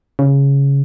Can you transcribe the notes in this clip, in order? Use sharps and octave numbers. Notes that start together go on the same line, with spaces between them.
C#3